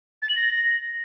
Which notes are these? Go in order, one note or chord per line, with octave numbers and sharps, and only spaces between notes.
A6
F#7
A#6